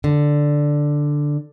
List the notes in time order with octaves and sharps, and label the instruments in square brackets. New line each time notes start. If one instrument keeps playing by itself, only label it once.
[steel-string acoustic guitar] D3